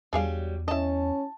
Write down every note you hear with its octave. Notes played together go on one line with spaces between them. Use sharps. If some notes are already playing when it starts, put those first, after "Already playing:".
E2 F#3 G3 D4 G#4 F5
C#4 E4 D#5 A5